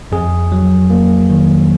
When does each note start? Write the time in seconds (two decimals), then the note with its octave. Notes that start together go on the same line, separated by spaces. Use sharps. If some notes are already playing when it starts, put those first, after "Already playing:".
0.12 F2 G#4
0.52 F#3
0.90 A#3
1.30 D#3